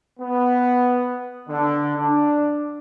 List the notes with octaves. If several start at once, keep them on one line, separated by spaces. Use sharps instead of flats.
B3
D3
D4